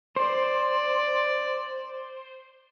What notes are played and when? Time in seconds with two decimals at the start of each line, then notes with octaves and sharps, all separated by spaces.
0.16 C5 D5